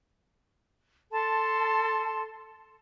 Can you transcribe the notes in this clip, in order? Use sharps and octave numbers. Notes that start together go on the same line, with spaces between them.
A4 A5 C6